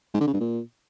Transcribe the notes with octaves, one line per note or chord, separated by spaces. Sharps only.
G#2
D3
C#3
G2
A#2